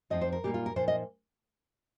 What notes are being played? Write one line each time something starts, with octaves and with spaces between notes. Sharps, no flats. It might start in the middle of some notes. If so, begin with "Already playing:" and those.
F2 F3 C4 D#4 D#5
C5
A#4
A#2 G3 A#3 D#4 G4
F4
A#4
A#2 F3 D#4 C5
D#5